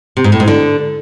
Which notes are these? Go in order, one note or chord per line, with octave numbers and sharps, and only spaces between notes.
C3
G#2
A2
G#2
D3